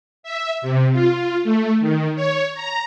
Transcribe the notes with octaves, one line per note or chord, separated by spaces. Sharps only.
E5
C3
F4
A3
D#3
C#5
A#5